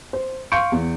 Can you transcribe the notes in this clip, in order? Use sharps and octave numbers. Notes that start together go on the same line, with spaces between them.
C5
F5 C6 C#6 G6 C#7 D7
E2